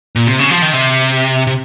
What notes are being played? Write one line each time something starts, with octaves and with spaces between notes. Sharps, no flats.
A#2
C3
C#3
F3
D#3
C3
C3